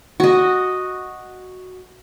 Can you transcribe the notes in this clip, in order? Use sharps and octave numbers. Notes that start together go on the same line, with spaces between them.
F#4 D#5